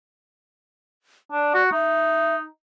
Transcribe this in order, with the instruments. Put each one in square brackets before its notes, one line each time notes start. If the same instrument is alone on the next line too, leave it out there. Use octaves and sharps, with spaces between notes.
[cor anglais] D4 [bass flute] D5
[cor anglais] F#4
[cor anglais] D#4 [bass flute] E5